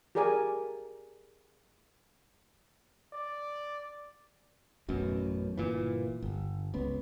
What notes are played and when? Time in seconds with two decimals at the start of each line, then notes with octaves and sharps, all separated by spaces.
0.15 G4 G#4 A#4 D5 G#5
3.13 D5
4.88 A1 F#2 B2
5.58 G1 A#2 E3
6.22 G1
6.74 C#2 B3